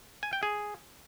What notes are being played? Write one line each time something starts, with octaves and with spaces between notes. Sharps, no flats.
G#5
G5
G#4